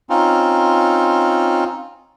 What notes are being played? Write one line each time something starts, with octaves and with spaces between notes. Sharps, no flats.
C4 C#4 D#4 F4